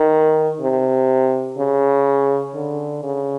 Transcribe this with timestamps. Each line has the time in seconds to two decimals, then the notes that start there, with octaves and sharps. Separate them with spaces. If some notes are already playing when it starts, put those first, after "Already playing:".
Already playing: D#3
0.61 C3
1.58 C#3
2.55 D3
3.03 C#3